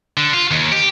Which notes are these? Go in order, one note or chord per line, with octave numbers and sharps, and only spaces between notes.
D3
F4
D#2
G4